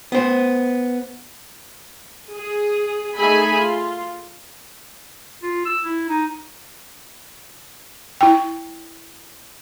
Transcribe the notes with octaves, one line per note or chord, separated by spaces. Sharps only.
B3 C5
G#4
A3 D#4 G#4 E5 G#5 B5
F4
F4
E6
E4
D#4
E4 G5